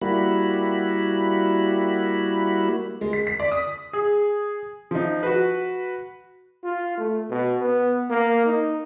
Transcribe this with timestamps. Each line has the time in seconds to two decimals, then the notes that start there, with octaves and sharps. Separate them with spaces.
0.02 G3 A#3 E4 F#4 B5
3.01 G#3
3.13 B6
3.27 B6
3.40 D5
3.52 D#6
3.93 G#4
4.91 F3 D#4
5.23 F#4 B4
6.64 F4
6.98 A3
7.30 B2
7.60 B3
8.10 A#3
8.46 D#4